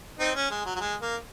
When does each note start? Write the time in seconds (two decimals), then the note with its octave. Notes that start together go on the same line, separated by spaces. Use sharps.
0.19 C4 D#4
0.36 C#4
0.51 G#3
0.65 F#3
0.76 F#3
0.80 G#3
1.02 A#3